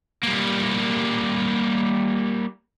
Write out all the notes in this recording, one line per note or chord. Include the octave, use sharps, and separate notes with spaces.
G3 A#3